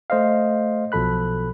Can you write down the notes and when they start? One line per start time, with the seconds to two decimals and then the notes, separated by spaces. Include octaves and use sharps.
0.10 A3 C5 D#5 F5
0.92 B1 B2 F3 A4 B5 F#6